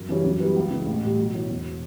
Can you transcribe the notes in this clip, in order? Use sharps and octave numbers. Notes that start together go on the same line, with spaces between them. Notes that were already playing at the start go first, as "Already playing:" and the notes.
Already playing: F#2
C#3 E3 G3 C#4
F#2
E3 G3 B3
C#2
C#3 E3
A1
A2 G3
B1
B2 F#3 C#4 E4
E1
B2